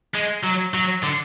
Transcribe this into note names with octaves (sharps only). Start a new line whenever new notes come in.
G#3
F#3
F#3
D3